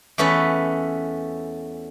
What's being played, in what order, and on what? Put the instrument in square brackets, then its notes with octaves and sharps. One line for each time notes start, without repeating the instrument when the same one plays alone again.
[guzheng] E2 A3 C#4 B4